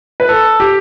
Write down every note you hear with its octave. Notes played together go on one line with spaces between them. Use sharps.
B4
A4
G4